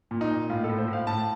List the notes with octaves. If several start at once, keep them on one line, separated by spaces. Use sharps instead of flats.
A#2
D#4
A#2
A2 F4
A4
A2
C5
A2
F5
A2 A5